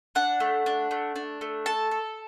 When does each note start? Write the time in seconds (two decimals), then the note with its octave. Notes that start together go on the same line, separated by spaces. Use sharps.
0.15 D4 F#5
0.40 A3
0.66 D4
0.91 A3
1.16 D4
1.41 A3
1.66 A4 A5
1.91 A4